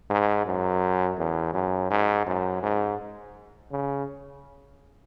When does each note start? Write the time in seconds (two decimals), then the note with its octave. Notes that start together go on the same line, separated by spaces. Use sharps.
0.10 G#2
0.46 F#2
1.18 E2
1.54 F#2
1.91 G#2
2.26 F#2
2.63 G#2
3.71 C#3